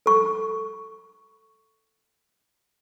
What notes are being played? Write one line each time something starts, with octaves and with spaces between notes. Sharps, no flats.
A4 C#6